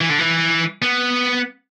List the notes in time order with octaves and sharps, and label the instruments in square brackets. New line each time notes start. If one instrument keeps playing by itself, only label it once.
[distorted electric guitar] E3
D3
E3
B3